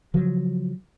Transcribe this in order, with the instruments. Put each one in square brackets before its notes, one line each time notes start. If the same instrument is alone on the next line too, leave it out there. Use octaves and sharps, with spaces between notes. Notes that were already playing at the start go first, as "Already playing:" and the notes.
[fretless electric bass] C#3 F3 F#3